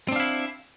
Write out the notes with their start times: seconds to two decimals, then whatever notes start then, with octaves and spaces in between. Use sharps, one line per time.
0.08 C4
0.12 D4
0.16 F5
0.20 E4